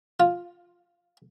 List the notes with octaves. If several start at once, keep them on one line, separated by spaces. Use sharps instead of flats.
F4